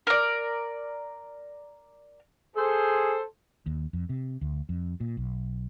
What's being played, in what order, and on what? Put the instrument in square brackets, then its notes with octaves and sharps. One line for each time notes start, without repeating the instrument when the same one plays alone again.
[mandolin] A#4 D5
[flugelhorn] G#4 [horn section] A4 C5
[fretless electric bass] D#2
F2
C3
D2
F2
A#2
B1